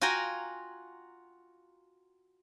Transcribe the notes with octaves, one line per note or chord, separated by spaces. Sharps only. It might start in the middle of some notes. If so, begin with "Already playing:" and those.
F4 F#4 G5 G#5 A#5